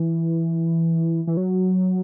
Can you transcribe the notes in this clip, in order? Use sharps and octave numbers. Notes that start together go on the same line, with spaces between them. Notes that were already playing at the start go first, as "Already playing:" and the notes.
Already playing: E3
E3
F#3